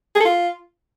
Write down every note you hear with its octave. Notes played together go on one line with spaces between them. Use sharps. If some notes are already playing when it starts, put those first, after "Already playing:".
G#4
A4
F4